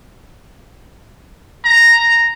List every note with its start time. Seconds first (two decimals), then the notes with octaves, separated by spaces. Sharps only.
1.65 A#5